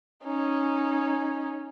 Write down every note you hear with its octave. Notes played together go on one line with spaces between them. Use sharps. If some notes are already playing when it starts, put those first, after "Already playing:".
C#4 D#4